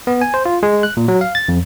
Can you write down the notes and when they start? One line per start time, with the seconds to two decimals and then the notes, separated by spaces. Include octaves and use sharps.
0.07 B3
0.21 G#5
0.34 C5
0.46 F4
0.63 G#3
0.83 F#6
0.97 A#2
1.08 F#3
1.21 F5
1.35 A6
1.48 F2